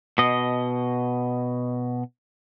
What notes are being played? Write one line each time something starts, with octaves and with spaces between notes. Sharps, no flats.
B2 D#5